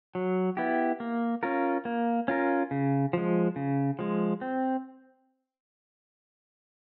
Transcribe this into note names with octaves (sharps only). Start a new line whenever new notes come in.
F#3
B3 E4 G4
A#3
C#4 F4 A#4
A#3
C#4 F4 A#4
C#3
F3 G#3
C#3
F3 G#3
C4